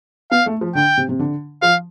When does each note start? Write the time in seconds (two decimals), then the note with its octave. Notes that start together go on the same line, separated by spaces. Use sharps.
0.31 B3 F5
0.46 A3
0.61 F3
0.75 D3 G5
0.97 C3
1.09 C3
1.19 D3
1.62 F3 F5